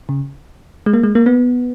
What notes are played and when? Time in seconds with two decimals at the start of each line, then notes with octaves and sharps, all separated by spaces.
0.09 C#3
0.86 G#3
0.94 A#3
1.03 G#3
1.15 A#3
1.26 B3